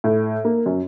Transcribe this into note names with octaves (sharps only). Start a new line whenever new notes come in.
A2
A#3
F#2